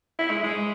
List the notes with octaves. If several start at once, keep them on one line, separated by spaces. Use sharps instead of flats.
E4
G#3
G#3